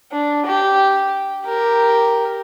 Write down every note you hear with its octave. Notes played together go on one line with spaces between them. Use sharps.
D4
G4
G4 A#4